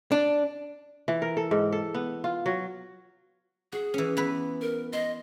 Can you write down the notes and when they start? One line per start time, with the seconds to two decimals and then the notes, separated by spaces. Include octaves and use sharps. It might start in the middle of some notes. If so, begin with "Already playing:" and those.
0.12 D4
1.08 E3
1.22 A#4
1.37 A4
1.51 G#2
1.72 A4
1.94 B3
2.24 F4
2.46 F#3
3.72 F#4 G#4
3.94 E3 C#4
4.17 E3 B3 B4
4.61 A#4
4.93 D#5 C6